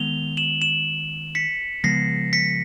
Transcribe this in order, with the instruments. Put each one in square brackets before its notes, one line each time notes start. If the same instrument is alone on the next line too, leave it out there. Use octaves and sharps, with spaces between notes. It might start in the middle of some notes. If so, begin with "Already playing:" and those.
Already playing: [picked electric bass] D#3 G#3 B3 [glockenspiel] F7 G7
[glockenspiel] E7 F#7
E7 F#7
B6 C#7
[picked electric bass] C#3 F3 G#3 B3 [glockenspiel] A#6 C7
[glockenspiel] B6 C#7